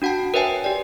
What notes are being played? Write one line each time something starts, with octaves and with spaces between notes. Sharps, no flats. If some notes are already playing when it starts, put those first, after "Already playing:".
D4 F#4 F#5 G5 A5
A#4 B4 C#5 E5 G5 G#5
G4 D5